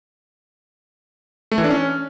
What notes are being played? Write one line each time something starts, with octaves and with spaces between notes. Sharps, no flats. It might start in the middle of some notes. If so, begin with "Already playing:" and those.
A3
E3
D4
C#4